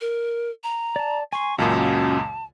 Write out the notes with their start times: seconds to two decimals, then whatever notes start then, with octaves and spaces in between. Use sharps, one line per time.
0.01 A#4
0.64 A#5
0.96 D5 A5
1.33 G#5 C6 C#6
1.58 C#2 F#2 A#2 C#4 F#4 A5 E6